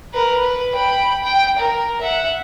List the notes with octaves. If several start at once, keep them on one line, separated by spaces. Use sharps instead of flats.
A#4 B4
B4
G5 B5
G5
A#4
E5 F#5